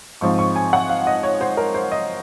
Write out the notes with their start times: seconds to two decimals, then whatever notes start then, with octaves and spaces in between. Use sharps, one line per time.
0.21 G#2 F3 C4 C#6
0.39 C#6
0.56 G#5
0.73 F#5
0.89 F5
1.07 D#5
1.23 C#5
1.41 C5
1.57 A#4
1.75 C5
1.91 D#5